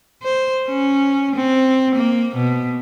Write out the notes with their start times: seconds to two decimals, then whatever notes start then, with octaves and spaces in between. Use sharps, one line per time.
0.23 C5
0.69 C#4
1.36 C4
1.95 A#3
2.35 B2